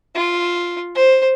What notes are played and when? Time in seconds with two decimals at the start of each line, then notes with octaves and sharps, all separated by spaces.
0.15 F4
0.95 C5